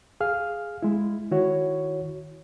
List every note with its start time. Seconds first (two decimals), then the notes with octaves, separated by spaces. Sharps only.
0.21 G#4 F5 F6
0.83 G#3 E4
1.31 D#3 E4 F#4 C#5